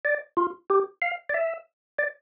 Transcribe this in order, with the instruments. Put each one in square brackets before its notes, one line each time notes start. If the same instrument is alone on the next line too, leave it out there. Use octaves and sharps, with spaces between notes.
[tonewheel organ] D5
F4
G4
F5
D5
E5
D5